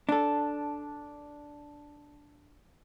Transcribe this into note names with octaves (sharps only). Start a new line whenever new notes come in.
D4 A4